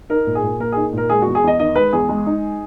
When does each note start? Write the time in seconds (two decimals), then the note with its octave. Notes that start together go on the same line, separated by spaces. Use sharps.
0.09 D#4 A#4
0.26 A#2
0.35 G#4
0.43 A#2
0.60 A#3 A#4
0.72 D#4 G#4
0.93 A#2 A#4
1.09 G#3 G#4
1.22 E2 F#4
1.35 G#4
1.43 E2 D#5
1.60 D#3 D#5
1.76 G#3 B4
1.93 E2 G#4
2.09 G#3
2.26 D#4